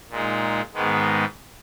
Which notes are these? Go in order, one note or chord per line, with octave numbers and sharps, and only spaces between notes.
A#2 G#3 D#4
G#2 D#3 G#3 B3